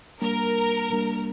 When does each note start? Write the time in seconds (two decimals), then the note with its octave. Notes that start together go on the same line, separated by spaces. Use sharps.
0.21 G3 A#3 D4 A#4
0.92 G3 A#3 D4